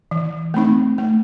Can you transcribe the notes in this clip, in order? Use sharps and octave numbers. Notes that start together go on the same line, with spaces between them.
E3
A3 C4 D#4
A3